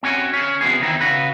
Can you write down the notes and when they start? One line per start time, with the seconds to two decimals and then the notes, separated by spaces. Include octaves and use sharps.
0.03 C4 C#4 F#4 C#5 G#5
0.33 C#4 G#4
0.61 C3 F3 B3 G#4
0.81 E2 D#3 C4 D#4 E4
1.01 C#3 F#4 B4